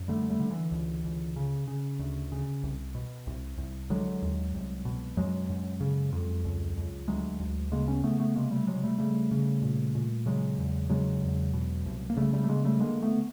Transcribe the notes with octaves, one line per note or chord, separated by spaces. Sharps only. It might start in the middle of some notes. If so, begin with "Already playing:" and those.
Already playing: F#2
D3 G3 A3
G3 A3
D3
D3 E3
C#2
C#2
C#3
C#3
D2
C#3
C2
B2
C2
C2
D3 F#3 G#3
D#2
C2
B2
F#2 F#3 G#3
F#2
C#3
F2
C#2
C#2
D2 F#3 G#3
D2
C#3 G#3 A#3
B3 C#4
C#3 A3 B3
A3 B3
C3 G#3 A#3
G3 A3
C3 F#3 G#3
G3 A3
C#3 G3 A3
C#3
A#2
A#2
C#3 F#3 G#3
E2
C#3 F#3 G#3
E2
B2
C2
A#3
C#3 G3 A3
G3 A3
A3
C#3 G#3 A#3
G3 A3
D3 G#3 A#3
A3 B3